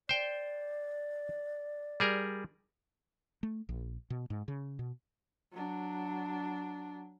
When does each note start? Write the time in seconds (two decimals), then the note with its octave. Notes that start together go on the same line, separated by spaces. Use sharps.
0.09 C5 D5 G5
2.00 G3 G#4 A#4
3.43 A3
3.69 A#1
4.10 B2
4.30 G#2
4.48 C#3
4.79 B2
5.52 F#3 D4